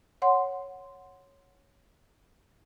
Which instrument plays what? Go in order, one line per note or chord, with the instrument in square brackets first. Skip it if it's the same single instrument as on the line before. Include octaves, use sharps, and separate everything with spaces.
[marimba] C#5 F#5 C6